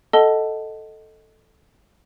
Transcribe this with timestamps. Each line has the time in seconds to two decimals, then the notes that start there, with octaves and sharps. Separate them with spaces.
0.13 A4 D#5 F#5 A5 G7